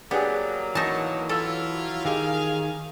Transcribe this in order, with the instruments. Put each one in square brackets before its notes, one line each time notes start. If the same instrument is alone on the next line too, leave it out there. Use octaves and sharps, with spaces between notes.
[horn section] F#3 A#3 [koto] B3 [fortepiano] D4 G4 G#4
[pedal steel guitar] E3 C#6 [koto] D#4 A5
[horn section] F#3 E4 F4 [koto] A4
[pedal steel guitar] D#3 [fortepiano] G4 [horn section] G#4 F5